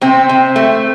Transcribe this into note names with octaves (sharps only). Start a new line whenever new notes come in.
C3 C4
C3
A3